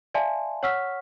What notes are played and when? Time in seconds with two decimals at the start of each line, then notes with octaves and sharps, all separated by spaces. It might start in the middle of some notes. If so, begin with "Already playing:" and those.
0.14 D5 E5 F5 G#5 A5 C6
0.63 C#5 F#5 C#6 E6 F6 B6